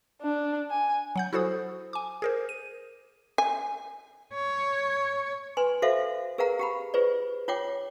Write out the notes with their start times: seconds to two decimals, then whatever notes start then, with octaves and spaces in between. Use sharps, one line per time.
0.22 D4
0.71 G#5
1.16 F#3 F#5 G6
1.33 E4 F#4 A4 C5 D#6
1.93 G#5 D6
2.22 G#4 A#4 C5
2.49 D#7
3.38 G#5
4.34 C#5
5.57 B4 G#5 C6
5.82 F#4 A4 C5 E5 F5
6.38 G#4 A#4 B4 F5 F#5 A#5
6.59 G4 F#5 B5
6.94 F4 G#4 B4 C5 D5
7.48 F4 C#5 F#5 G5 D6